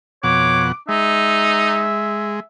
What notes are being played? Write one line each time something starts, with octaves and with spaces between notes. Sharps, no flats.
F2 B2 C#5 F#5 D6
G#3 D#4 E5